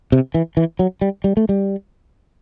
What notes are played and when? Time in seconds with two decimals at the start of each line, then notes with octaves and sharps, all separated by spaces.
0.12 C3
0.34 E3
0.57 E3
0.79 F#3
1.01 G3
1.24 G3
1.37 A3
1.49 G3